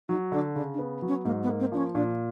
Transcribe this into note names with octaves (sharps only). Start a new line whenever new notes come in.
F#3 D#4
D3 D4
C#3 D4
D4
B3
F#3
C#4
G#2 A#3
B3
A#3
C4
F3 D4
C#4
A#2 D4